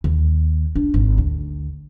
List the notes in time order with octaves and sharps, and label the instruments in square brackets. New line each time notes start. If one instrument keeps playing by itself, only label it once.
[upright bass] D#2
D4
G#1
D2